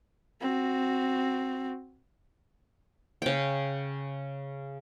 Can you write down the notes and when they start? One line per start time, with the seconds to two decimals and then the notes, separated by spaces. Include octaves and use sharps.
0.41 C4 F#4
3.22 C#3 G5